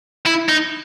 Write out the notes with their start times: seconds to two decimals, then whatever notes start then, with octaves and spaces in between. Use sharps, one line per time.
0.26 E4
0.49 D#4